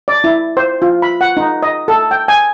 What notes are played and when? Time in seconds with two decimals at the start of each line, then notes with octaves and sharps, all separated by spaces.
0.08 D5
0.24 E4
0.57 C5
0.82 F4
1.02 B5
1.21 F#5
1.37 D#4
1.63 D#5
1.88 A4
2.11 G5
2.28 G#5